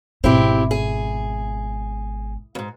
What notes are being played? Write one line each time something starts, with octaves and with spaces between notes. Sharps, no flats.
G#1 B2 C4 E4 G4
G#4
F2 G#2